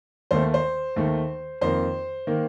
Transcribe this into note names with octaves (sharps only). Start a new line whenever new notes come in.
D#2 D#3 A3 C5
C5
D#2 D#3 A3
F2 D#3 A#3 C5
D#3 A#3